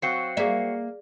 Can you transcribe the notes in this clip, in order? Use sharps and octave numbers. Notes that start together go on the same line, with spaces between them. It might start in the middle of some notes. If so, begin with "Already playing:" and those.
F#3 C4 F#4 F5 C7 C#7
A#3 G#4 D5 E5